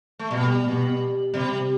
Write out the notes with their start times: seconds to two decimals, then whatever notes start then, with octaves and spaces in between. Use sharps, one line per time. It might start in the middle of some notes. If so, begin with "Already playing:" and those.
0.19 A3
0.31 B2 G3
0.65 B2
1.34 C3 G3